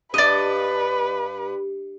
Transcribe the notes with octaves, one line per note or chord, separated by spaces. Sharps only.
G2 B4 D5 D#5